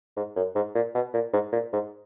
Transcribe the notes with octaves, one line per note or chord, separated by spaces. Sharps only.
G#2
F#2
G#2
A#2
B2
A#2
G#2
A#2
G#2